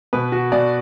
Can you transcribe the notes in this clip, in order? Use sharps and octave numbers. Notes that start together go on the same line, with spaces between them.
B2 B4
F#4
B2 D5